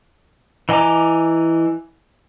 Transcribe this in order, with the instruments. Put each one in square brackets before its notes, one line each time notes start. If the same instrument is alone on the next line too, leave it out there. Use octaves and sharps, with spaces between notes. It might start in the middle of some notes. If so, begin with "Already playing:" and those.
[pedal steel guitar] E3 D#5 G#5 A#5 D6